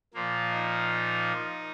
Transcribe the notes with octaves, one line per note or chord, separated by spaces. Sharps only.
A#2 F3 A#3
D#4